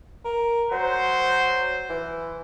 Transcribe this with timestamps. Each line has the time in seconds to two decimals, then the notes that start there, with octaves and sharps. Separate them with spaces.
0.25 A#4
0.72 F#3 C5
1.89 E3